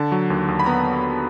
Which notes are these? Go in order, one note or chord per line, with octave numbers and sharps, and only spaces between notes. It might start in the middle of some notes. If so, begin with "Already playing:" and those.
Already playing: D3 A5
F#3
D#2
D#2
B5
B3 A#5